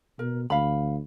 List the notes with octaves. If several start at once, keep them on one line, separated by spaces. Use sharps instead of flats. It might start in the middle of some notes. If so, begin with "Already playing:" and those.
B2 A#4
D2 F5 B5